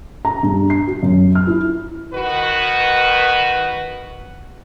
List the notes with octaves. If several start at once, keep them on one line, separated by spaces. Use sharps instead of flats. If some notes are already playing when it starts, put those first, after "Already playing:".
A#5
G2
C7
F#4
F#2
F6
E4
D#3 F#4 B4